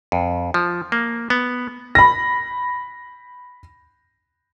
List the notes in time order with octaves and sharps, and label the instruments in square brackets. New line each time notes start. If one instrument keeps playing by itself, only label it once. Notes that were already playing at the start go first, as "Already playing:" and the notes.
[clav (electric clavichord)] F2
F3
A#3
B3
[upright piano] B5 A#6